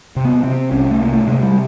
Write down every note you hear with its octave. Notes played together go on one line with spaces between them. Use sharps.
C3
B3
C3 C4
C2 C#4
A3
C3 A#3
A3
C3 G#3
G3